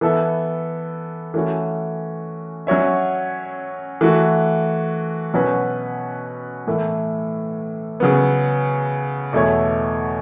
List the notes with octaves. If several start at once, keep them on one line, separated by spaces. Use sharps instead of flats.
E3 B3 A4 E5
E3 A3 C#4 F#4
F#3 C#4 F#4 C#5 E5
E3 A3 F#4
B2 F#3 C#4 F#4 B4
A2 E3 A3
C#3 F#3 B3
E2 B2 A3 E4 C#5